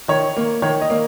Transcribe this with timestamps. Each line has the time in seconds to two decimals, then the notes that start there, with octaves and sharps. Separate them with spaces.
0.08 D#3 C#5
0.36 A#3
0.62 D#3 C#5
0.81 D#5
0.90 A#3